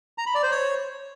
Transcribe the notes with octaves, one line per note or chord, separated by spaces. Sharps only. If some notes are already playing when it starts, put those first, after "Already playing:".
A#5
B5
D5
C5
C#5